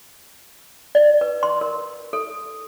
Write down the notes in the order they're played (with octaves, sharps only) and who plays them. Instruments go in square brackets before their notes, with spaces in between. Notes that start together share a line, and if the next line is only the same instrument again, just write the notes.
[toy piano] D5
B4
C6
A#4
A4